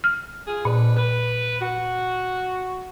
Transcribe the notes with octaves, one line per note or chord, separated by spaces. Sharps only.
F6
F4 G#4
F2 A#2 D4 B4
B4
F#4